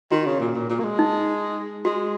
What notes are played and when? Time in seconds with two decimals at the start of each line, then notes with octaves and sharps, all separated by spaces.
0.11 D#3 F#4
0.26 C#3
0.40 A#2
0.55 A#2
0.70 A#2
0.80 A#3
0.84 G#3
0.99 D#4
1.85 G#3 F#4